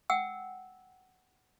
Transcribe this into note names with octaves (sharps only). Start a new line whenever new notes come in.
F#5 G5 E6